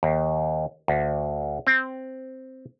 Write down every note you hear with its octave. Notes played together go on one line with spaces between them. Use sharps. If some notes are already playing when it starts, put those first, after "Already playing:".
D#2
D2
C4